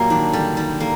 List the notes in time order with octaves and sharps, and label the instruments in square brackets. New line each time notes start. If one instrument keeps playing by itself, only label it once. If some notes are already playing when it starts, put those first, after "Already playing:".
Already playing: [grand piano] A#2 F#3 [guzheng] G3 A#3
[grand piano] D#3 [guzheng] D4
[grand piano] D3 [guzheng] G3
[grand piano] D#3 [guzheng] G3
[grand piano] D3 [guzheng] A#3